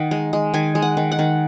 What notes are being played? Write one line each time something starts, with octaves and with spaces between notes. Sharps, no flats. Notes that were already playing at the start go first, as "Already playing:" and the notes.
Already playing: D#3 F#5
G#3
G#3
D#3 G#5
G#3
F#5
D#3
F#5
D#3